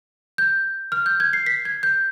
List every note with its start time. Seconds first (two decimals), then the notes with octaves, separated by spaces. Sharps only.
0.38 G6
0.92 F6
1.06 G6
1.20 G#6
1.33 C7
1.46 B6
1.65 G#6
1.83 G6